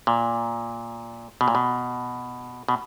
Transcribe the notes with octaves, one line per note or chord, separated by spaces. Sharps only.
A#2
B2
A#2
B2
B2